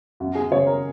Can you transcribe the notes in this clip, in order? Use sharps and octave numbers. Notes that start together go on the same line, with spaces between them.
F#2 F#4
G#4
C#3 C#5
A#4